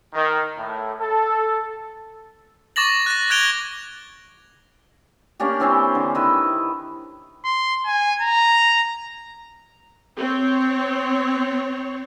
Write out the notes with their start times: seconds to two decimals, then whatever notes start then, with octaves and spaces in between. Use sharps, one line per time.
0.14 D#3
0.57 A2
1.00 A4
2.76 C#6 D6 A6 A#6 F#7
3.06 F#6 A#6
3.30 F#6 G#6 A#6 D7 F7 G7
5.40 A#3 C#4 D4 G4
5.60 E3 C4 C#4 C5
5.95 D3
6.15 D#3 E4 B4
7.45 C6
7.86 G#5
8.21 A#5
10.18 C4 C#5